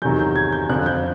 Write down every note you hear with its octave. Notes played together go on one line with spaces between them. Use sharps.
E2 C3 D#3 F#3 G6
G6
G#6
G6
F2 D3 F3 F#6
G6